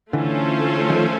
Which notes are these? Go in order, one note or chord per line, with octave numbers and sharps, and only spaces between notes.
D3 E3 A3 C#4 F4 A4 C5
D#3 F3